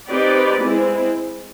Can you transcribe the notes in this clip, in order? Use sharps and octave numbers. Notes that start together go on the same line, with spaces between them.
C4 D#4 G4 B4 D5
G#3 C4 E4